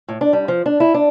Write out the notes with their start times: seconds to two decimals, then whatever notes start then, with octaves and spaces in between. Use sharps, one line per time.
0.08 A2
0.21 D4
0.33 G3
0.48 F3
0.66 D4
0.80 E4
0.94 D4